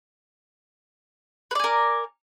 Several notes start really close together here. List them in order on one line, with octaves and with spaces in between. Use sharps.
B4 D5 G#5 A#4